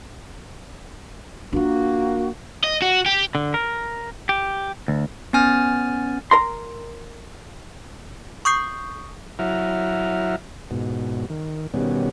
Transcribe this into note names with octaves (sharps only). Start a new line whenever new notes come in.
A#3 D4 F4 F#4
D#5
F#4
G4
D3
A#4
G4
D2
B3 C#4 G#5 F6 A6
A#4 A#5 C6
C#6 D#6 G6 C7
F#3 E4 E5 F#5 A#5 F6
G#2 B2
D#3
B2 D#3 G3 B3 C#4